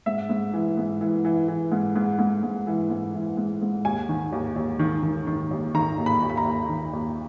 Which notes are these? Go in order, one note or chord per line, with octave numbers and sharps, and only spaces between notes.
G#2 E5
G#2
E3
G#2
E3
E3
E3
G#2
G#2
G#2
G#2
E3
G#2
E3
G#2
G#2
D#2 G#5
D#3
D#2
D#2
D#3
D#3
D#3
D#2
D#3 A#5
D#2
B5
D#2
B5
A#5
D#2
D#3
D#2